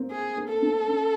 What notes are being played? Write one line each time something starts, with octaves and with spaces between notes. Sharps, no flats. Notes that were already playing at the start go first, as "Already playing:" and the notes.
Already playing: A#3 C4
G#4
A#3
A4
C4
C#4